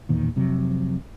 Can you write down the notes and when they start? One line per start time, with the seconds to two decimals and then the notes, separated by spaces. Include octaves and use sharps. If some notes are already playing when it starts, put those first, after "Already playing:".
0.09 D1 E2 A#2 D#3
0.36 F1 F2 C3 F#3